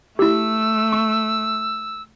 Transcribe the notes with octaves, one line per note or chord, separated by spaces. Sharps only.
A3 E4 G4 E6
C#6